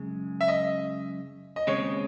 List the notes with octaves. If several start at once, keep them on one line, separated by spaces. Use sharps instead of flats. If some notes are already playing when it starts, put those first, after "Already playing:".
Already playing: F#2 C#3 G#3
E5
D#5
D#5
D#2 C#3 G#3 C4 C#5